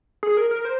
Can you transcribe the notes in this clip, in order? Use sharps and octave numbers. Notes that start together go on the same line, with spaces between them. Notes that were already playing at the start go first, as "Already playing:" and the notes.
G#4
A#4
A#4
C5